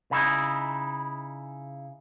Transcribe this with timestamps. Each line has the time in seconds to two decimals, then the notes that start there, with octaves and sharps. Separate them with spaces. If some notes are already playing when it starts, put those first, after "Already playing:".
0.11 C#3 D#4 E4